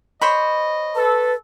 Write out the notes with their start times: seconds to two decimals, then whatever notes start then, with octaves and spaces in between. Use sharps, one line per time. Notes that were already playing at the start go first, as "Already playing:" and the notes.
0.22 C5 C#5 D#5 B5
0.96 A4 B4